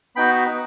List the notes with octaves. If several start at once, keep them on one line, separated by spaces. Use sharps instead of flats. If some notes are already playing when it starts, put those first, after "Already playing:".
B3 D#4 F#4 G5 B5